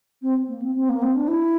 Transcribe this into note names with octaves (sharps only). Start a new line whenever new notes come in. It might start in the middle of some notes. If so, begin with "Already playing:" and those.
C4
A#3
C4
C4
A#3
C4
D4
E4